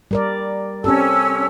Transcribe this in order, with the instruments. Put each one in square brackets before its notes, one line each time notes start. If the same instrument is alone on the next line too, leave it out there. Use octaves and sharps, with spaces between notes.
[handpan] G3 A#4 D5
[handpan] C4 G4 A4 [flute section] C#4 E6